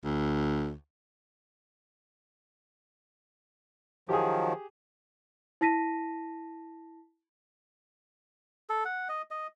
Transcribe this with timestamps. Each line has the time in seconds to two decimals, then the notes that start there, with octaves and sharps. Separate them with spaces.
0.04 D2
4.09 D#3 F3 F#3 G4 G#4
5.61 E4 A5 A#6 B6 D#7
8.70 A4
8.85 F#5
9.09 D#5
9.31 D#5